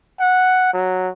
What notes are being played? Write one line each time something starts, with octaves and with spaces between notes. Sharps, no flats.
F#5
F#3